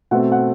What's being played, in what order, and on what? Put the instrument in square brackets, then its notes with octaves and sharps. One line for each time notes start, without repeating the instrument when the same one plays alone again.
[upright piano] B2 A3 C4 F#5
F#5